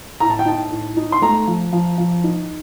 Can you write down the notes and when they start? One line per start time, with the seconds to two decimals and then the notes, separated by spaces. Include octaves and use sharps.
0.20 A2 A#5
0.30 A5
0.39 G5
0.46 D#4 A5
0.71 A2
0.97 D#4
1.12 C6
1.22 A3 A#5
1.47 F3
1.72 F3
1.98 F3
2.24 D#4